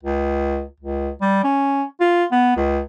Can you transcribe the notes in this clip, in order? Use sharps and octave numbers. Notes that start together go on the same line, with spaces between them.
C#2
C#2
G3
C#4
F4
B3
C#2